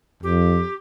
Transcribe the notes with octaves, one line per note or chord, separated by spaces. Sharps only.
F2 G4